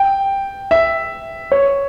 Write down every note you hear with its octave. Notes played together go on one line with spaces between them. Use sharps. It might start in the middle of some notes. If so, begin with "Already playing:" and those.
Already playing: G5
E5
C#5